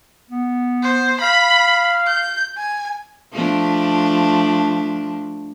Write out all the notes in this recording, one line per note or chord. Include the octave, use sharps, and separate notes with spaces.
B3
C5
F5 B5
G6
G#5
F3 A3 D4